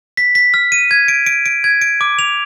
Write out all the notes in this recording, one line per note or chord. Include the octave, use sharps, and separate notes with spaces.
B6
B6
F6
D#7
G#6
D7
D7
D7
G#6
D7
D6
F7